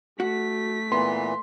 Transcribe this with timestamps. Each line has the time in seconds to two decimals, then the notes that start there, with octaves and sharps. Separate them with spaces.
0.20 A3 F#4 F#5 B6
0.92 A#2 E3 B3 C6